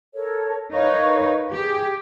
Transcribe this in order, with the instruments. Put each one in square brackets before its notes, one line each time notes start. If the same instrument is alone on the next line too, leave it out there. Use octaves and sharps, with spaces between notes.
[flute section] A4 A#4 C#5
[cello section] D#4 A#4 B4 [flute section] C#5 F5 C#6
[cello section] G4 [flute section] G#4